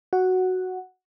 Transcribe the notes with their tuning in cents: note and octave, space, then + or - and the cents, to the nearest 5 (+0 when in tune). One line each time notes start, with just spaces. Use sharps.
F#4 +0 F#5 +0